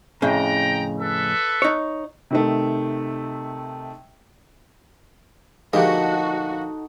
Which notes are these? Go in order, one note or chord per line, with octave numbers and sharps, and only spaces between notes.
F2 A2 C#3 G5 A#5
A4 B4 E5
D#4 C#5
C3 D#3 A3
D2 A#2 F3 G#3 D#4 F#4 G4 A4